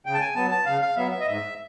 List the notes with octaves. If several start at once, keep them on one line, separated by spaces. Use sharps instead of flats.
C#3 G5
A5
G#5
F#3 B3 A5
A5
C#3 F5
F5
F#3 B3 E5
E5
D#5
G#2 E5